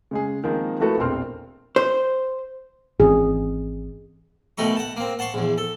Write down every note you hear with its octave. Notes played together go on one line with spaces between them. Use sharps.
C#3 G#3 G#4
D#3 F3 G#3 A#3 C4
F3 A3 E4 F#4 A4 B4
E1 A#1 A#3 C4 C6 F6
C5
G#1 E3 C4 G#4
B1 B2 D#3 A3 D#4 C#6
F#5 A5
A#3 C4
F#5 A5 C6 C#6
A#1 E2
A4